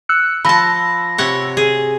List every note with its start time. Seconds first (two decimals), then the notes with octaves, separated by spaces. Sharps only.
0.09 E6 F#6 C#7
0.45 F3 A5 B5 E6 A#6
1.18 C3 C#5 F#5
1.57 G#4